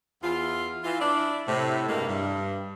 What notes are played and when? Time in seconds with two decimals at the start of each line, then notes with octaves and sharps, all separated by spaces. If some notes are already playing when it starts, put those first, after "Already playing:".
0.22 E2 F4
0.84 E3 F4
1.00 D4 E4 D5
1.47 A2 C3
1.88 G2 C3 G#3 A#3 E4
2.08 G2